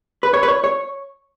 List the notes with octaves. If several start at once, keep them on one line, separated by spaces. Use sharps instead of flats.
B4
C#5
B4
C#5
C#5